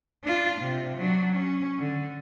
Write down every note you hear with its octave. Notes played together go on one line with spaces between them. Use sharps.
D4 F4
C3
F#3 D4
C#4
D3